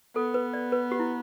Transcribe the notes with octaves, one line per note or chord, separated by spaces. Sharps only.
B3 A4
B4
D5
B4
G4
E4